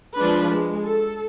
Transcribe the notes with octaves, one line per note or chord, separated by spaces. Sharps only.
F3 G#3 D4 B4
G#3
A4